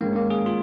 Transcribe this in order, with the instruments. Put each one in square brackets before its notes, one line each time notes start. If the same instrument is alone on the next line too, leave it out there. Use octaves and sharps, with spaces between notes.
[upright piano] G#2 D#3 G#3 C#4 [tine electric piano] A#3
[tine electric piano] A#3
G#4
F4